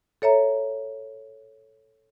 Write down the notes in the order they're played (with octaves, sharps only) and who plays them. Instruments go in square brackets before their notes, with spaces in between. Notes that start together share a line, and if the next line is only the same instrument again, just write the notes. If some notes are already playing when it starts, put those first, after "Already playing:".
[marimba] A4 C#5 E5 A#5